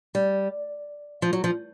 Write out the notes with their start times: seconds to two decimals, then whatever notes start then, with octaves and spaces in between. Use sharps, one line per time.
0.15 G3
1.22 F3
1.33 F#3
1.44 F3